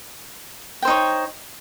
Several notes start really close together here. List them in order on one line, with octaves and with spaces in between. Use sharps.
G5 C5 D#4 C#5